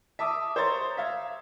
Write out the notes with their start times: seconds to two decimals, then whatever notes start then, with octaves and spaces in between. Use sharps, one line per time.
0.19 E5 A5 D6 D#6
0.56 C5 C#5 A#5 C6 A6
0.97 E5 F5 G#6